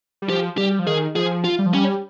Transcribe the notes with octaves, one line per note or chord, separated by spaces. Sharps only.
G3
F3 G4
G3 G4
F3
D#3 G#4
F3 G#4
F4
G3
F3
G3 C#4